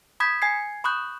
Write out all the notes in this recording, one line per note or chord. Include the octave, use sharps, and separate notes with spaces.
B5 D#6 G6 G#6 B6
G#5 G#6 C7
B5 C#6 D#6 F#6 G6